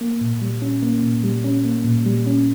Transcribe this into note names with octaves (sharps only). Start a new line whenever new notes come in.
A#3
A#2
G3
C#4
A#3
A#2
G3
C#4
A#3
A#2
G3
C#4